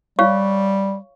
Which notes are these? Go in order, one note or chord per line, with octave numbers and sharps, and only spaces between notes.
G3 C#5 F5 C#6